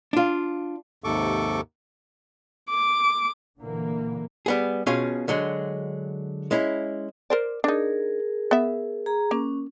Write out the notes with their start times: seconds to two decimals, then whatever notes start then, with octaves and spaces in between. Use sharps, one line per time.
0.13 D4 F4
1.04 D#2 G#2 C3 A4 C#6 D6
2.70 D6
3.60 A#2 D3 E3 A#3
4.46 G3 B3 G#4
4.86 B2 C#4 F4 G#4 F5
5.28 D3 F#3 G#3
6.51 G#3 C#4 E4
7.30 A#4 C5 D5
7.64 D4 D#4 G#4 A#4
8.51 B3 E5
9.06 G#4 A#5
9.31 A#3 C#4